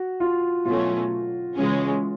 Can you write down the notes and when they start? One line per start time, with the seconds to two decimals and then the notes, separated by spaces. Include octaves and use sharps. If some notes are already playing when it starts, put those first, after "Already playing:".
Already playing: F#4
0.20 F4
0.65 B2 F#3 A3 C#4 F4
1.55 C#3 E3 G#3 C#4